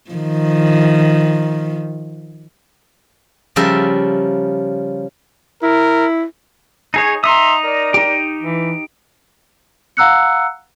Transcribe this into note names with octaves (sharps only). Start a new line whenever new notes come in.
D#3 F3
C#3 F3 G3 A#4 E5
E4 A#4
D#4 G#4 C#5
D#4 E5 A#5 C6 D#6
A#4 D5
D#4 G4
E3
F5 F#5 A#5 E6 F#6 C#7